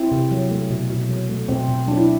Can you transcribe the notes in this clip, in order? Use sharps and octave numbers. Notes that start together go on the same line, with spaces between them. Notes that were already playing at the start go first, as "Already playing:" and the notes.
Already playing: C4 E4
C3
F#3
A3
B2
B2
F#3
A3
B2 C4
B2
F#3 D4
E4